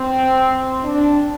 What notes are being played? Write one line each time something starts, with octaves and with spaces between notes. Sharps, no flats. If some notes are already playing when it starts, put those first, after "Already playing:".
Already playing: C4
D4